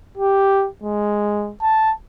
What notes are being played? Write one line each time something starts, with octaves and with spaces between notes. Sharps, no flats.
G4
G#3
A5